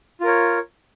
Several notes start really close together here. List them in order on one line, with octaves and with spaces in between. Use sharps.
F4 A#4 C#5